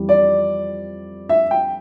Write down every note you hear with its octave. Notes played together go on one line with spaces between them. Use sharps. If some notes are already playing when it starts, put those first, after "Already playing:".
Already playing: F2 E3 G3
D5
E5
G5